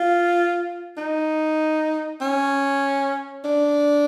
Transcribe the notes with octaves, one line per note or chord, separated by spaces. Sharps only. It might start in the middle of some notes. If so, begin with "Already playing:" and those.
Already playing: F4
D#4
C#4
D4